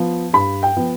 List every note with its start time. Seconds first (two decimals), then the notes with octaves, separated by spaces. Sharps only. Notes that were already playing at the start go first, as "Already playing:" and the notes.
Already playing: F3 B3
0.33 G2 B5
0.63 G5
0.76 F3 B3